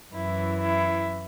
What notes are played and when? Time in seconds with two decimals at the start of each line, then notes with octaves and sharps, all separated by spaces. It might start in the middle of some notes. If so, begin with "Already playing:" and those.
0.14 F#2 E3 E4
0.61 E4